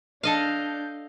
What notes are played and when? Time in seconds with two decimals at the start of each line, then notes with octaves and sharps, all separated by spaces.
0.23 D4 A4 D#5 F5 G6